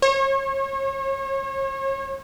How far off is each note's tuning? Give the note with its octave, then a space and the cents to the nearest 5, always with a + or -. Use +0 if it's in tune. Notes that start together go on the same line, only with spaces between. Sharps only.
C#5 -35